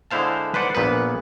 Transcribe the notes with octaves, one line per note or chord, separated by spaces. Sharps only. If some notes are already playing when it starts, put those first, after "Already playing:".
D3 G#3 E4 C5 F5 A5
B4 C5 D5 F#5
A#1 A#2 B3 B4